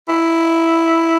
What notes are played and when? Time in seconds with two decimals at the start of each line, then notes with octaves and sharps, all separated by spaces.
0.08 E4